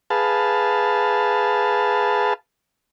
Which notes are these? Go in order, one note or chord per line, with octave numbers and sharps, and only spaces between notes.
G#4 B4 F5 A5